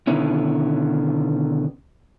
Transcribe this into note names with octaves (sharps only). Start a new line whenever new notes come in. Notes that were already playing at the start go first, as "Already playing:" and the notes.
B2 D3 D#3 B3 C#4 E4